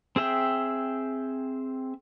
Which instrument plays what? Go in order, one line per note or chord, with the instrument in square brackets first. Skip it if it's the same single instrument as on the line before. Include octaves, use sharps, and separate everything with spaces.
[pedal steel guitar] C4 G#4 E5 G5